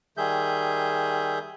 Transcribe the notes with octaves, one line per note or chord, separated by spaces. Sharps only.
D#3 G3 G#4 E5 G6